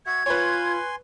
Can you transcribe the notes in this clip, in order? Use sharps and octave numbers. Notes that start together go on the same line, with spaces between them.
F#4 E5 F#5 G#6
F4 B4 C#5 G#5 C6